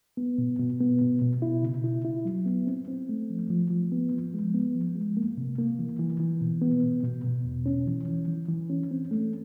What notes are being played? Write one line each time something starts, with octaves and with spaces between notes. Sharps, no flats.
B3
B2
B2
B3
B2
B2
E4
C#3
E4
E4
F#3
B3
C4
C4
A3
F3
F3
F3
B3
F3
G#3
B3
F3
G#3
A#3
C3
A#3
E3
E3
E3
B2
B3
B2
B2
B2
E2
C#4
E3
E3
E3
E3
C#4
C4
A3